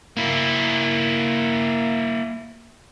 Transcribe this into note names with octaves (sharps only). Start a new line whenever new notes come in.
A#3 E4